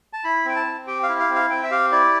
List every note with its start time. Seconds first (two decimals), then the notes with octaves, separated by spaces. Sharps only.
0.13 A5
0.24 E4 B5
0.45 C4 G5
0.56 A5
0.66 C4
0.87 G4 G5
1.03 F5
1.09 E4
1.19 F5
1.29 C4
1.35 F5
1.50 C4 G5
1.64 E5
1.71 G4 F5
1.92 E4 D5